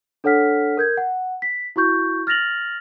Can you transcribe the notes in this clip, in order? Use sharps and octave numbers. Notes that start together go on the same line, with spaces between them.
D4 A4 C#5 F#5 F6 B6
A#4 G6 G#6
F#5
B6
E4 F#4 C#6 G6
F6 A6 A#6 F7 F#7